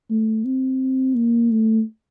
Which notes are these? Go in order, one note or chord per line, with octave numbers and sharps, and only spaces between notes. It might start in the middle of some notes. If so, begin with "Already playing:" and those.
A3
C4
A#3
A3